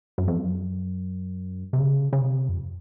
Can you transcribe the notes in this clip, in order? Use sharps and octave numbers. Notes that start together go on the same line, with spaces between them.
F#2
F2
F#2
C3
C#3
C#3
C3
F2